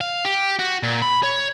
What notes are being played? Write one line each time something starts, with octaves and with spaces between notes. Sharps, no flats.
F5
G4
F#4
A#2
B5
C#5